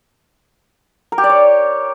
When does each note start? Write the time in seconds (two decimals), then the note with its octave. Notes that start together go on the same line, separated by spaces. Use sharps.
1.12 A#4
1.18 G4
1.24 D5
1.29 C#5